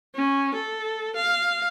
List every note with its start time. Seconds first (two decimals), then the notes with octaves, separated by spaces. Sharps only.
0.15 C#4
0.54 A4
1.16 F5